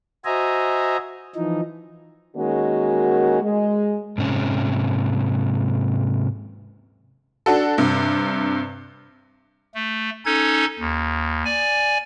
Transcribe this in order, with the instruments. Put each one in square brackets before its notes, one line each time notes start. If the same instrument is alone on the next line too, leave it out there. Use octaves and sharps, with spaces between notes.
[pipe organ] F#4 C5 D#5 E5 G#5 A#5
E3 F3 D#4
[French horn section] D#3 G#3 A#3 C#4 F#4
G#3
[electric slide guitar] G#2 C3 C#4
[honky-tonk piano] D4 F#4 A4
G2 C3
[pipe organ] A3
C#4 D#4 A4 G#6
D#2
D5 G#5